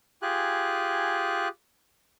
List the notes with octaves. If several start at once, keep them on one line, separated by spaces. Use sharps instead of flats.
F4 G4 G#4 G#5 F#6